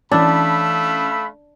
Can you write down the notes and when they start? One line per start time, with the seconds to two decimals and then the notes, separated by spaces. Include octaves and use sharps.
0.12 E3 A3 C#4 D4 F5 B5 E6